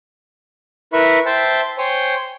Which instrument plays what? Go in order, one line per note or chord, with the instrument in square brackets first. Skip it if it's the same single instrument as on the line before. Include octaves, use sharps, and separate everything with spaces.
[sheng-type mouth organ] E4 A#4 B4 E5 B5 C#6
C5 E5 G5 A5
C5 C#5 G5 G#5